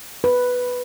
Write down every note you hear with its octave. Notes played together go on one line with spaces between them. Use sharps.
B4